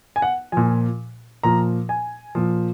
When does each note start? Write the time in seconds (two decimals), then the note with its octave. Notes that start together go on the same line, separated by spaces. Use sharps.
0.16 G#5
0.22 F#5
0.52 A#2 F3 G#5
1.43 A#2 F3 A#5
1.89 G#5
2.35 A#2 F3